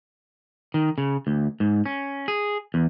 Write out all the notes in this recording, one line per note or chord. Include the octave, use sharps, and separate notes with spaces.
D#3
C#3
D2
G#2
C#4
G#4
E2